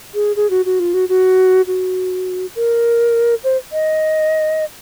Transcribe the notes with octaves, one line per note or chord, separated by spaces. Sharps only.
G#4
G#4
F#4
F#4
F4
F#4
F#4
F#4
A#4
C5
D#5